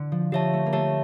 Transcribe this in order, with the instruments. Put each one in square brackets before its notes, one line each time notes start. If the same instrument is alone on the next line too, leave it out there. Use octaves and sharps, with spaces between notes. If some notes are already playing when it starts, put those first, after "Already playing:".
Already playing: [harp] D3
F3
[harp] F3 [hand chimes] G4 C#5 E5 A5
[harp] A3
A#3
[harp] A3 [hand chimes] G4 C#5 E5 A5